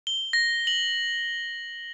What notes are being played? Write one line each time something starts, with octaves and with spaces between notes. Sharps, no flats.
G7
A#6
F#7